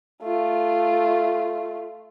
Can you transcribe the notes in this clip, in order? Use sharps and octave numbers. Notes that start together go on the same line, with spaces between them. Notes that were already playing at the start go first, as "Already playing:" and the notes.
A3 F4